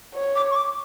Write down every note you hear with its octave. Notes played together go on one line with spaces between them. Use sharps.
C#5
D6
C#6
D6